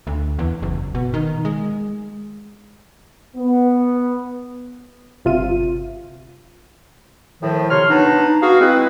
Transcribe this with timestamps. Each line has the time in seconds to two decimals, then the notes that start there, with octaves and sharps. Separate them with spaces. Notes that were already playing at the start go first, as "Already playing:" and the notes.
0.07 D2
0.39 E2
0.62 F#1
0.95 B2
1.14 D#3
1.45 G#3
3.37 B3
5.25 G1 C3 F4 E5 D#7
7.42 A2 D#3 F3
7.71 F2 C3 C#5 C6 F6
7.90 B3 D4 D#4
8.42 B3 F#4 G#4 F5
8.61 G#3 C4 E4 B4